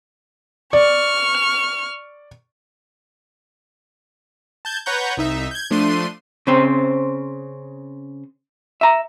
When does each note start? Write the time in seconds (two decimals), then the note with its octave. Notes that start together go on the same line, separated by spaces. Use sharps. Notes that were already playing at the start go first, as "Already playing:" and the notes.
0.73 D5 C#6 F6
4.65 A5 G6 G#6
4.86 B4 C#5 F#5 A#5 C#6 G6
5.17 C2 D#4 E5
5.51 G6 G#6
5.70 F3 A3 D4 C6 D#7
6.47 C#3 C4 C5
8.81 E5 A#5